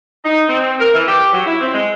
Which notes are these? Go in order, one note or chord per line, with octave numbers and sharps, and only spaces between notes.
D#4
C4
A#4
E3
G4
F#3
E4
C4
G#3